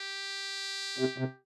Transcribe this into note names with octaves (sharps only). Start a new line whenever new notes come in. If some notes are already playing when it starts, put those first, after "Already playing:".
Already playing: G4
C3
C3